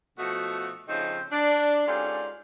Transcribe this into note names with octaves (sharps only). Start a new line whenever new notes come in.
B2 F3 A3 D#4 F#4
C#3 F3 A3 C4 C#4 D#4
D4
G#2 C#4 F4 G4 A4 D5